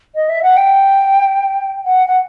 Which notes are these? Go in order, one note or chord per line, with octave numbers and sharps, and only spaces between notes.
D#5
E5
F#5
G5
F#5
F#5